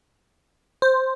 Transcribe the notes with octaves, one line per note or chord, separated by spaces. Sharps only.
C5